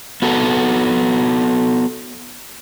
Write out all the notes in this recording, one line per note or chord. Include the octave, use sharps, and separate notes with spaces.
B3 F#4 A4